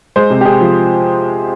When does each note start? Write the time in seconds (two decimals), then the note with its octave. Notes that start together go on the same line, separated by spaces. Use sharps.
0.16 G#3 C5
0.30 C3
0.41 G4
0.45 C3 G#4
0.61 F3